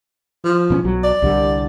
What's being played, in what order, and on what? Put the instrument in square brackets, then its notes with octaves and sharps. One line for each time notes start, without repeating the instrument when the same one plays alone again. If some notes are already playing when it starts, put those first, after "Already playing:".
[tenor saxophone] F3
[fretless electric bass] B2 B3 C#4
B1 F#3
[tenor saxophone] D5
[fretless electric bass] C2 D3 G3